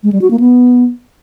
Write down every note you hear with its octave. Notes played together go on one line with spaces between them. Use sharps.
G#3
G3
F#4
A#3
B3